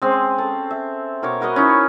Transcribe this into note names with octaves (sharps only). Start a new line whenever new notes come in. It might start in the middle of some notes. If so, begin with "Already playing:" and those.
G#3 C4 C#4
A4
E5
B2 A#4 C#5 D6
F#4 A#4 B4 D#5
C#4 D#4 E4